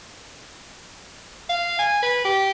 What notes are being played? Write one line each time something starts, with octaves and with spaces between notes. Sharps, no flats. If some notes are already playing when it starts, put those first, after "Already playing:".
F5
G#5
B4
G4